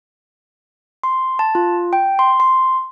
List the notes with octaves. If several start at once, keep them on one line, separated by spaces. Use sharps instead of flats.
C6
A5
F4
G5
C6
C6